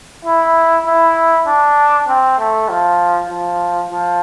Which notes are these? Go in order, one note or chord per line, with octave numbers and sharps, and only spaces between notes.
E4
E4
D4
C4
A3
F3
F3
F3